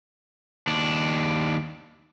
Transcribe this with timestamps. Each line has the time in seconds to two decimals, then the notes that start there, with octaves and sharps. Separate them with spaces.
0.67 D#2 D4